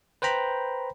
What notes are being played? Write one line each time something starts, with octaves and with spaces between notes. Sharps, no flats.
B4 C5 G5 A#5 B5